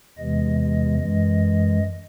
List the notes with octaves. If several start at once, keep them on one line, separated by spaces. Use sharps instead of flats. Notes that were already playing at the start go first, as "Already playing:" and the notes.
E2 C3 E3 G#3 D#5
D#5
F#2 E3 G#3 D#5